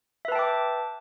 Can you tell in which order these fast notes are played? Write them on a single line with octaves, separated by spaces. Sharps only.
E5 B4 A5 G5 D6